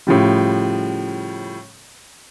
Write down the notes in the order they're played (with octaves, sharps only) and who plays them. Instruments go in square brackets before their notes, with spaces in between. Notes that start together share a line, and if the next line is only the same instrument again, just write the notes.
[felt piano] A2 C#3 F3 G3